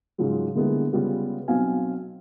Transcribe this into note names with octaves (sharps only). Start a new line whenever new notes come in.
G#2 C#3 F3 F#3 G#3
D3 G3 G#3 A#3 B3 E4
C#3 G3 G#3 B3 F4
B1 B2 F#3 C4 F5 G#5